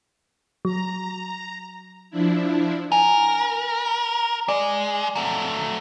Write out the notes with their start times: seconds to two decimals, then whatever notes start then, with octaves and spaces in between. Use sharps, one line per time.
0.65 F#3 A#5
2.11 F3 D4 E4
2.92 A#4 G#5
4.48 G#3 D5
5.15 F#3 A3